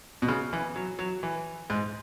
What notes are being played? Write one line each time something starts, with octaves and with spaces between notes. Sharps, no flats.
B2
C#3
E3
F#3
F#3
E3
G#2